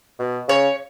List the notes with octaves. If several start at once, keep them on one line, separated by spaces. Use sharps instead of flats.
B2
C#3 C#5